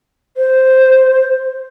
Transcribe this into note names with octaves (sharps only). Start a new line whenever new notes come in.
C5